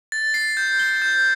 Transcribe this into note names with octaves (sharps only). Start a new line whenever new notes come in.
A6
C7
G6
G7
G6